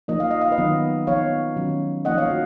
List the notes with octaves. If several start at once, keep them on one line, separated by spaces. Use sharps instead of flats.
F3 A#3 D#4 D#5
F5
D#5
F5
B4 D#5
D#3 F#3 B3 D#4
F3 B3 D#4 C#5 F5
D#3 F#3 C#4
F3 A#3 D#4 D#5 F#5
C#5 F5
F#4